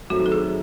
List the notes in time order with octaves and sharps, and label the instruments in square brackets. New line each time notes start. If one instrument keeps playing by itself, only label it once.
[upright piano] F#2 D#3 A3 C4 D#4 [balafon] F#4
[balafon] A4
G#4